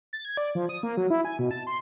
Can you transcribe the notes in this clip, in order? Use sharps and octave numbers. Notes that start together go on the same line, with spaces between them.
A6
G#6
D5
F3
D#6
A#3
F#3
E4
G#5
B2
A5
C6